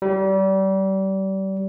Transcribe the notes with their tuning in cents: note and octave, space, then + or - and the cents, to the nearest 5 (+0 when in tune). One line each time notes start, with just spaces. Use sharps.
G3 -30